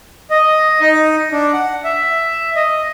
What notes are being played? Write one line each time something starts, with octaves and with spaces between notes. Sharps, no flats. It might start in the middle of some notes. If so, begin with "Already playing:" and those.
D#5
D#4
D4
F#5
E5
D#5